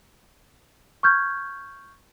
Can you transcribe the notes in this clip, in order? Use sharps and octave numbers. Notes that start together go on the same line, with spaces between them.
C#6 F6 G6 G#6